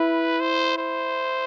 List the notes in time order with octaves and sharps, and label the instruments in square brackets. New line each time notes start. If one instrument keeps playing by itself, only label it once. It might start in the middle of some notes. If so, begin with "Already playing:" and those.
Already playing: [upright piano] E4 [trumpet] B4
[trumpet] C5
C5